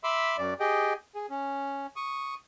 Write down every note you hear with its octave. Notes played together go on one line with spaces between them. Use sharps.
E5 B5 C6 D6 E6
F#2 D5
G4 G#4 D#5 G5
G#4
C#4
C#6 D#6